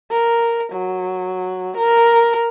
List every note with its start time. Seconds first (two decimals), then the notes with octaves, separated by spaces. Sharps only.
0.12 A#4
0.73 F#3
1.77 A#4